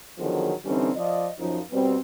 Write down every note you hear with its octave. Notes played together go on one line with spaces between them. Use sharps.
D3 D#3 F3 F#3 B3 G#4
D3 E3 G3 C4 C#4 D#4
F3 F4 D5 D#5
F#2 F3 D#4
B2 G3 B3 C4